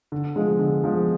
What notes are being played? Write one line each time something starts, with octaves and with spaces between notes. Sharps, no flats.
D3
F3 G#3
D3
F3 G#3